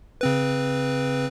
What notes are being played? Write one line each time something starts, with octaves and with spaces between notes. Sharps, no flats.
C#3 C4 B4